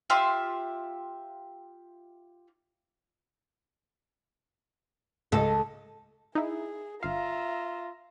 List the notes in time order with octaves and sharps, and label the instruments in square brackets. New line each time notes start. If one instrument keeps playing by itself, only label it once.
[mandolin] F4 G4 E5 C6
[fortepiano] C#2 D#5 [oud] A4
[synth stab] D#4 E4 [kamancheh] G#4
[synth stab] G1 F5 [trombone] F4 [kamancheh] E5 A#5